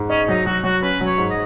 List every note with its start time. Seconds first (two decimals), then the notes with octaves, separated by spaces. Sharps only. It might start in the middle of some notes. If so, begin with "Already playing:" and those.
Already playing: G#2
0.10 C#4 D#5
0.28 F#3 D#4
0.46 F#3 F#4
0.64 F#3 F#4
0.82 C#4 B4
1.01 F#3
1.06 C#5
1.18 G#2
1.30 D#5